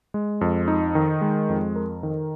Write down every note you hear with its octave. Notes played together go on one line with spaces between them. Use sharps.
G#3
F2
D#4
D#3
G#3
F2
A#4
D#3